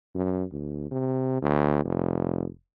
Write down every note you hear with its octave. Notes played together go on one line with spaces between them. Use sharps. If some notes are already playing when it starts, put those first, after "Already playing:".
F#2
D2
C3
D2
F1